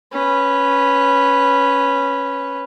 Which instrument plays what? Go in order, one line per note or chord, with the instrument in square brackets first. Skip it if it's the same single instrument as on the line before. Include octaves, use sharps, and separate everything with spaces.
[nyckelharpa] C#4 B4